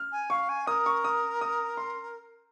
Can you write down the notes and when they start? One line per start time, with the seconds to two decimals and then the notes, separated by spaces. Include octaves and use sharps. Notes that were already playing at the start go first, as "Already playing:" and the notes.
Already playing: F6
0.12 G#5
0.30 F5 C#6
0.49 G#5
0.67 A#4 D#6
0.86 C#6
1.04 D#6
1.41 D#6
1.77 C6